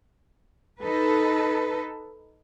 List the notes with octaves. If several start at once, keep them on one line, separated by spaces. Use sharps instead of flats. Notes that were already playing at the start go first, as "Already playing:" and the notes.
D#4 A4 B4